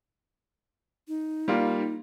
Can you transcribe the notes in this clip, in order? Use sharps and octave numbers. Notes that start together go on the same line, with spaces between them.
D#4
G3 A#3 F4